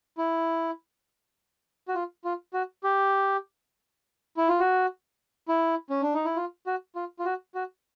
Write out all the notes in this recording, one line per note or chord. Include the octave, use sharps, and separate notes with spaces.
E4
F#4
F4
F4
F#4
G4
E4
F4
F#4
E4
C#4
D4
D#4
E4
F4
F#4
F4
F4
F#4
F#4